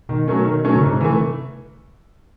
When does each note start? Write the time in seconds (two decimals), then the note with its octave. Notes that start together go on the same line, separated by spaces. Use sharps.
0.09 B2 D#3
0.28 F#3 A3 C#4
0.45 D#3
0.65 F#3 A3 C#4
0.76 C#3
0.83 G#2 C3
1.01 E3 A3